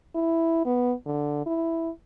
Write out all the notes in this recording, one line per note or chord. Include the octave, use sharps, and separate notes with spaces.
E4
B3
D3
E4